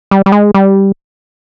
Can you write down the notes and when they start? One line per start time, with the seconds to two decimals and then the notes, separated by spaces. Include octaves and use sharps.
0.11 G3
0.26 G3
0.32 G#3
0.54 G3